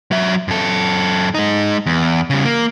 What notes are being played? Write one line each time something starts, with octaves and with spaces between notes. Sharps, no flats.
F#3 E5
F#2 A4
G#3 D#4
E2
C#3 G3
A#3